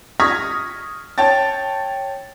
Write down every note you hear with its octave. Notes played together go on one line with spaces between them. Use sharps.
C#6 D#6 F6 G#6 A#6 B6
C#5 G5 A5 A6